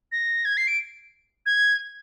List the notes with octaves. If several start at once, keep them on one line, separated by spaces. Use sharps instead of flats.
A#6
G#6
C7
D7
G#6